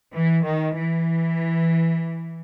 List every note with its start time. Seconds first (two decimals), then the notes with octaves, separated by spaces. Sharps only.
0.15 E3
0.46 D#3
0.77 E3